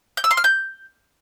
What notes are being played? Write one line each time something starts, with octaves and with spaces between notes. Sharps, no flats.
G6
E6
C6
F6
G6